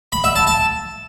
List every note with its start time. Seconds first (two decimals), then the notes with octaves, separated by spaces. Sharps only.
0.12 B5
0.24 E5
0.35 A5
0.47 A5